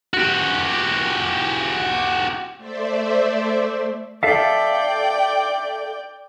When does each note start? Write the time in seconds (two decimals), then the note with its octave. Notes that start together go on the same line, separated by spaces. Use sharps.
0.14 F#4 G4
2.58 A3 C5 D5 E5
4.23 A4 D5 E5 F5 G5